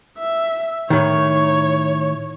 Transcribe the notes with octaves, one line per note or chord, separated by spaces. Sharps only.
E5
A2 D#3 C#5